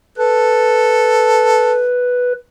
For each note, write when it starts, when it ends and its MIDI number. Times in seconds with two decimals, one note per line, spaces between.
0.18 1.85 69
0.18 2.33 71